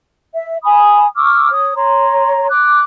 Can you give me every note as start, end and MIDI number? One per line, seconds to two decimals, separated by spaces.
0.34 0.57 76
0.64 1.06 80
0.64 1.06 83
0.64 1.06 87
1.17 1.51 85
1.17 1.51 86
1.17 1.51 88
1.17 1.51 89
1.51 1.74 73
1.51 1.74 87
1.75 2.49 73
1.75 2.49 82
1.75 2.49 84
2.50 2.84 86
2.50 2.84 90